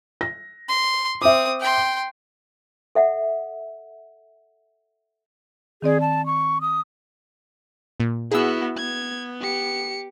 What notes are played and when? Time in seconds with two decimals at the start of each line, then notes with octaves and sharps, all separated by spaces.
0.21 A#6
0.68 C6
1.22 C4 E5 D6 D#6
1.60 G5 C6
2.95 A4 E5 F#5
5.82 D#3 C4 G#4 D5
6.01 A5
6.26 C#6
6.61 D#6
8.00 A#2
8.32 B3 E4 F#4 G#4 E6
8.77 B3 G#6
9.41 G4 C#7